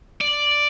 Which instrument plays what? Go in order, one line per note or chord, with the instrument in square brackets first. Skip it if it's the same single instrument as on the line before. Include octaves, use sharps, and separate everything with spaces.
[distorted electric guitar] D5